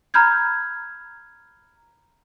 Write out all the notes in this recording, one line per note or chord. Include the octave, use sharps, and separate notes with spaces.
A#5 B5 F6 G6 G#6